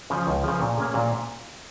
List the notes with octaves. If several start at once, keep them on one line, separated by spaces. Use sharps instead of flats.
C#3 F3
C#2
C#3 F3
A#2
A#3 C#4 G#4
A#2